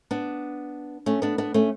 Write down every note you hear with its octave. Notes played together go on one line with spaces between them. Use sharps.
B3 D4
A3 C#4
B3 D4
B3 D4
A3 C#4